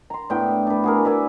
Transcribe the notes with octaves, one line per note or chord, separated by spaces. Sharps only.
A#5 C6
A2 B3 D4 G5
D4 B4
F#4 G#4 A#4
B4 D5 E5 G#5